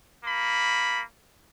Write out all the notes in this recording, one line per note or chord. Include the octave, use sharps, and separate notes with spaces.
A#3 B5